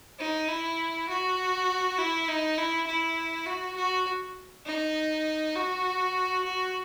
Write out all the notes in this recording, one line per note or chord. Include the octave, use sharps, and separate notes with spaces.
D#4
E4
F#4
E4
D#4
E4
E4
F#4
F#4
D#4
F#4
F#4